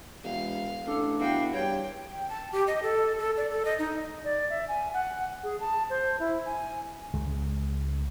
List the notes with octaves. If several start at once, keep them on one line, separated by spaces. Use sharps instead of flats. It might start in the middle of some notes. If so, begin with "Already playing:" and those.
E1 F5
A1 D4 A4
E2 F#4 F5 G5
G2 C#5 G5
G5
A5
G4
D#5
A4
A4
D5
A4
D#5
D#4
D5
E5
G#5
F#5
G#4
A5
C5
E4
G#5
C#2 G#3